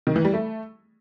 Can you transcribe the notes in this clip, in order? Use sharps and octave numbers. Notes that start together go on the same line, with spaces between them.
D#3
E3
G3
A3